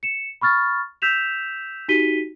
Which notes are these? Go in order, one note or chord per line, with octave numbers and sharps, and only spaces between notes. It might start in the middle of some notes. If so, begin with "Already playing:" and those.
C#7 E7
B5 C#6 F6 A6
E6 G6 B6 E7 F7
D#4 F#4 G4 B6 D#7 G7